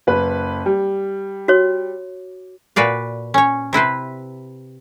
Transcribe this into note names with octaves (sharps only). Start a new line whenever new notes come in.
F#1 B4
G3
F#4 C#5
A#2 F#4 B4 D5 F5
C#4 C#5
C3 E4 B4 C5